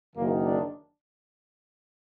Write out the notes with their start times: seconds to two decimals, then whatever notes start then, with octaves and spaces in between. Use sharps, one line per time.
0.16 F#1 F#2 D#3 A#3
0.44 D4